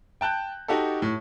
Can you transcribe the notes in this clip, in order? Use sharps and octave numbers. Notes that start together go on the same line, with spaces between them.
G5 A5 F#6 G6
D#4 F#4 G4 A4
A2